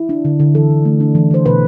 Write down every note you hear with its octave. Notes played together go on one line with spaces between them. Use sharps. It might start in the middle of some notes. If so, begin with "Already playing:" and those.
Already playing: E4
D4
D3
D3
E3 A4
E3
A3
D4
E3
E3 C5
B2 B4